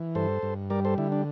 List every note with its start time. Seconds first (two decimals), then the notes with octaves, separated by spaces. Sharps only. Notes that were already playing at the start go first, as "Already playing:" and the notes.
Already playing: E3
0.15 G2 A4 C5
0.42 G2
0.70 G3 A#4 D5
0.85 A4 C5
0.98 D3 E4
1.12 D4